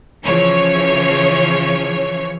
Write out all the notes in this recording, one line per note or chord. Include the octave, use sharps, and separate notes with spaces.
C#3 E3 F3 C#5